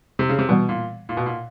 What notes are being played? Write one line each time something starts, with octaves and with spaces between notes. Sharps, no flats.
C3
C#3
C3
B2 E3 G3 B3
A#2
A#2
B2
A#2